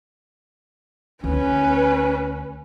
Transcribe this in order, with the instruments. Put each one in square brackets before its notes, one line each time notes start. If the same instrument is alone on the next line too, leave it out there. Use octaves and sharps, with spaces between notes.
[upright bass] D2 [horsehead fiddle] C#4 B4